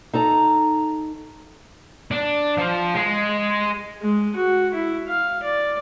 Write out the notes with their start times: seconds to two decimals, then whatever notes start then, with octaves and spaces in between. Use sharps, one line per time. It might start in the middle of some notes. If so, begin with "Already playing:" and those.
0.13 D#4 A4 A#5
2.11 D4
2.58 F3
2.95 G#3
4.02 G#3
4.36 F#4
4.74 E4
5.08 F5
5.43 D5